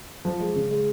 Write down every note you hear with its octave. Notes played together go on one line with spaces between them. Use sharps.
F3
G#3
C#3
G#3